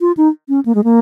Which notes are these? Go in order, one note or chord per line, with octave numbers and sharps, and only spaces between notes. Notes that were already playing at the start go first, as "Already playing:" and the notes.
F4
D#4
C#4
A#3
G#3
A#3